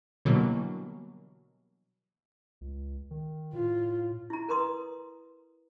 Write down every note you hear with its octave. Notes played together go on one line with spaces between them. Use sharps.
B2 D3 E3 F#3 G3 A#3
C#2
D#3
A2 F4
E4 A#5
A#4 B4 A#5 C6 D#6